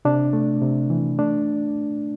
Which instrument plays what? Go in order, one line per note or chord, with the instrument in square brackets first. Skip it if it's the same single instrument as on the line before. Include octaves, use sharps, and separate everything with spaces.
[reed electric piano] C3 D4
A3
C3
E3
A3 D4